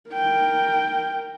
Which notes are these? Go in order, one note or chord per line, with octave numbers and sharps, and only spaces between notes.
A#4 G5